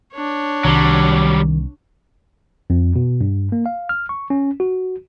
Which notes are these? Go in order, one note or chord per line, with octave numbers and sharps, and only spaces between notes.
D4 C#5
C2 D#3 F#3 G3
F2
B2
G2
A#3
F5
F6
C#6
C#4
F#4